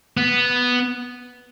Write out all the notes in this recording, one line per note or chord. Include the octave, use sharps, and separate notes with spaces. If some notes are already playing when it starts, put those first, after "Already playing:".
B3